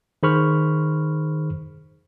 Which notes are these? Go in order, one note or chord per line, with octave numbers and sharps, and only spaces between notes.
D#3 G#4 C5 B5 C#6 F6